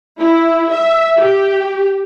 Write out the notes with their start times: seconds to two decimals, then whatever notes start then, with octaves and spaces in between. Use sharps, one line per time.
0.18 E4
0.71 E5
1.18 G4